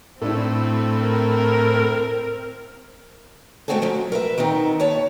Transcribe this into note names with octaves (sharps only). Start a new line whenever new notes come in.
A2 A3 C4 D4 E4
A#4
G#3 A3 C4 F#4 G#4 A4
F3 F#3 C#4
A#4 B4 E5
D#3 B3 C4 D#4
D#2 C#5 A5